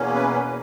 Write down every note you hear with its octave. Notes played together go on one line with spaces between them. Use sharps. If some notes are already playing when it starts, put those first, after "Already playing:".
Already playing: E2 B2 A#3 C#4
B4